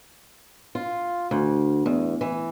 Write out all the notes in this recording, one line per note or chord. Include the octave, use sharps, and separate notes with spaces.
F4
D2
E2
E3